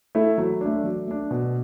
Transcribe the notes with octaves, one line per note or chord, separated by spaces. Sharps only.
A3 E4 A4
F#3
A3 D4
F#3
A3 D4
B2